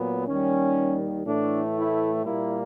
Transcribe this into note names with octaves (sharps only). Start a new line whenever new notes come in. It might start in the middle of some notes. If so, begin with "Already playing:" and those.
Already playing: A#2 F#3 B3
D#2 D#3 G3 C#4
A2 E3 A3 D4
E4
A#2 G3 A#3 E4